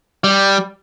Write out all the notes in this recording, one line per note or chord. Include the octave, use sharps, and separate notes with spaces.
G3